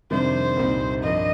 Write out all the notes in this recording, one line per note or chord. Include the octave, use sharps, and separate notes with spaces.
F2 C3 D#3 G3 D4 C5
C2 A#2 G3 C4 D#4
G2 F3 A#3 D4 D#5